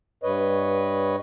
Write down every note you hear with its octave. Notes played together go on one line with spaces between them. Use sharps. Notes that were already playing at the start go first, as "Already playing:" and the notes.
G2 B4 C#5 D#5